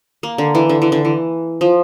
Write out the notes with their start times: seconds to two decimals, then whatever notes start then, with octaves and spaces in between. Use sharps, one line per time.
0.23 A#3
0.38 D3
0.55 E3
0.69 D3
0.82 E3
0.92 D3
1.05 E3
1.61 F3